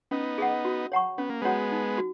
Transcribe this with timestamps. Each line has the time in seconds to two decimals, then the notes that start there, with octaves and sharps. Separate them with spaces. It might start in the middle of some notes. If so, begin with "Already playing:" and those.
0.11 B3 C#4 D#4
0.38 G#4 D#5 F#5
0.65 F#4
0.92 C#5 F#5 A#5 C#6
1.18 B3 C#4
1.30 A#3
1.42 G#3 B3 F#4 C#5 F#5 A#5
1.72 D#4
1.98 F#4